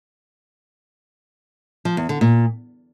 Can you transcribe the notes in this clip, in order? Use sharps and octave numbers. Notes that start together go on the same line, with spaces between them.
F3
E2
D3
A#2